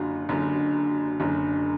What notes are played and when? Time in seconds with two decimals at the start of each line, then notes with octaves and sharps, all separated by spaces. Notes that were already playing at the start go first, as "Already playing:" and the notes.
Already playing: F#1 F#2 D3 F4 F#4
0.29 F#1 F#2 D3
1.20 F#1 F#2 D3